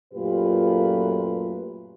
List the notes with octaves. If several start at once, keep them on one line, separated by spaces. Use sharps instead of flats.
F#2 A#2 A3 F4 G4 B4